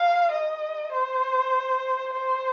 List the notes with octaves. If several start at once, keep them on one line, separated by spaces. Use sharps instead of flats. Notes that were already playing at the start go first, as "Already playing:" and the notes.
Already playing: F5
D#5
C5
C5